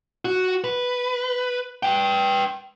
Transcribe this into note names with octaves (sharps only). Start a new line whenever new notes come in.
F#4
B4
B4 G5